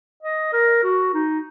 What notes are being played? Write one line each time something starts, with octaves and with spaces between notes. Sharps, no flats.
D#5
A#4
F#4
D#4